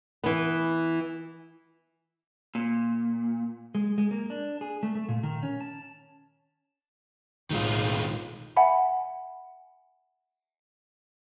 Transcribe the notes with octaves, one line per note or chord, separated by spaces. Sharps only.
E3 B3
A#2
G#3
G#3
A#3
D4
G#4
A3
A3
A#2
D#3
C#4
A5
B1 A2 D#3 G#3 F4
E5 F#5 G#5 B5